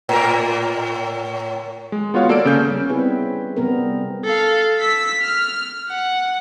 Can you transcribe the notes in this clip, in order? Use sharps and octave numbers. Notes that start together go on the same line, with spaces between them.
A2 A#4
G#3
B3 F4 F#4 C#5 F5 F#5
A#3 A4 D5 E6 D7
C#3 C#4 G6
G3 C#4
B3 C4 E4 G#4 B4
C3 G3 B3 C4 A#4
A4 F5
E6 B6
F6
F#5